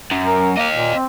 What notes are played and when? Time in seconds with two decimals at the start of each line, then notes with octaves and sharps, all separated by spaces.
0.11 F#2
0.26 A#4
0.57 A#3 D#5 F5
0.74 A#2
0.95 C4